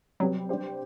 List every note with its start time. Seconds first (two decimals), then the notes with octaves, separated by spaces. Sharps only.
0.20 C3 F#3 G3 C4 G4 B4
0.49 G3 D4 G4 C5